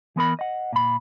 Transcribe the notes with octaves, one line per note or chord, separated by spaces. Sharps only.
E3 B3 A#4 B5
D#5 F#5
A#2 B5